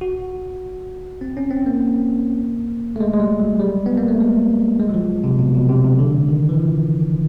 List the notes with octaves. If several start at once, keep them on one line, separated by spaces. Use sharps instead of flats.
F#4
C4
C#4
C4
A#3
A3
G#3
G#3
G3
F#3
G3
B3
A#3
A3
G#3
G#3
F#3
F3
C3
B2
B2
C3
C3
D3
D#3
E3
F3